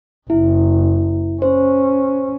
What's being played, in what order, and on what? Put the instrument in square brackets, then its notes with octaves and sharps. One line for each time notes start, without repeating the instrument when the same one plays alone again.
[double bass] F#1 [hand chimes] E4
[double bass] C#4 [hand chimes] C5